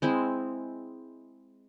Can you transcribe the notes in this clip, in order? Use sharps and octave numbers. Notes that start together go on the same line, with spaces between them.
G#3 C4 E4 E5